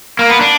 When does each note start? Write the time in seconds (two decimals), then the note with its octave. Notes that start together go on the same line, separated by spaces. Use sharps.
0.19 A#3
0.30 B3
0.41 D4